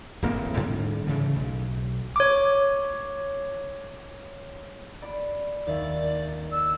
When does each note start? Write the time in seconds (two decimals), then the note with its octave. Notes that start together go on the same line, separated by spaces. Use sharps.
0.22 D1 A1 A#3 C4
0.57 G#2 D3 G3
1.07 C#3 E3 A3
1.35 B1
2.16 C#5 D6
5.02 D5 B5
5.67 D#2 D5 E5
6.52 E6